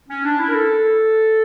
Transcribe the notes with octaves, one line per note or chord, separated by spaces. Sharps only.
C#4
D4
E4
A#4
A4